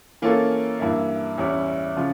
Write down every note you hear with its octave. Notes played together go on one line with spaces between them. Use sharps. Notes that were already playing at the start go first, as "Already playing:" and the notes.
E3 A#3 C#4 F4 A4
G2 E3 A#3 E4
E2 E3 G3 C#4 E4
C#3 F3 C#4 F4